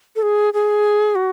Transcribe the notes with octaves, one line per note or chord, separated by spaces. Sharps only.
A4
G#4
G#4
F#4